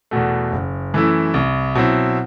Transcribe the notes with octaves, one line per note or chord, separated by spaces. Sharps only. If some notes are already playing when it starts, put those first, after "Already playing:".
E2 B2 A3
F#1
F#2 E3 A3 E4
C2
B2 F#3 C4 E4